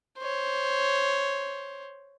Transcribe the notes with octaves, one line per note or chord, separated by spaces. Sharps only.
C5 C#5